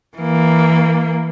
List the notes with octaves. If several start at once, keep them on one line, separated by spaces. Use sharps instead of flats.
E3 A#3